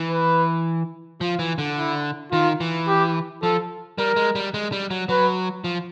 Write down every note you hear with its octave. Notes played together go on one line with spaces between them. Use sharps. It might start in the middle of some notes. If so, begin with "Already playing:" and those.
Already playing: E3
B4
F3 F4
E3
D3
E4
D#3 F4
E3
G4
F3 A4
G3 A#4
G#3
G3
G#3
G3
F#3
F#3 B4
F3